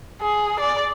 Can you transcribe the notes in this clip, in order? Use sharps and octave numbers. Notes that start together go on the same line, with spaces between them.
G#4
D5